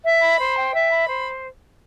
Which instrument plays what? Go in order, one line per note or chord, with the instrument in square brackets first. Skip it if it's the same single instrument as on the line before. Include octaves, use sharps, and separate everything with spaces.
[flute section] E5
B5
C5
G5
E5
B5
C5